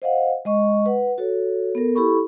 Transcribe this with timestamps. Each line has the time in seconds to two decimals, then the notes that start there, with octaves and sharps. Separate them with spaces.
0.02 C5 D#5 F5 F#5
0.45 G#3 D#5 C#6
0.86 B4 F#5
1.18 F#4 A4 C#5
1.75 B3 A4 A#4
1.95 E4 G4 A4 B5 C#6